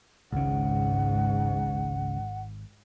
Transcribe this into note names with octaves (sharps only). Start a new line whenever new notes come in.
G#1 C#2 G#2 C#3 F#5